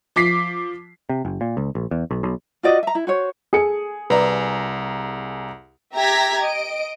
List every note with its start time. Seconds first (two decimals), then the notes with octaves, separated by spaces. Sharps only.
0.16 F3 D6 B6 C7
1.09 C3
1.25 F#1
1.41 A#2
1.57 C#2
1.75 A#1
1.91 E2
2.11 B1
2.23 B1
2.63 F4 F#4 D5 D#5
2.83 E5 A#5
2.95 E4
3.07 F#4 C5 C#5
3.53 G#4 A4 C#7
4.10 C2 B4 D5 E5 A#5
5.95 G4 E5 A#5 G#6 A#6 B6
6.42 D#5 D7